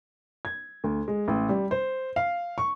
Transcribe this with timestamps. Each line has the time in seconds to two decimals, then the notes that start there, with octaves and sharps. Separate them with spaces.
0.45 G#6
0.84 D2
1.08 G#3
1.28 A1
1.49 G3
1.71 C5
2.16 F5
2.58 C#6